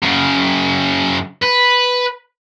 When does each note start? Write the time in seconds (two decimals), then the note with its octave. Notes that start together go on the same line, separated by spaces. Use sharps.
0.03 F#2 C#3
1.42 B4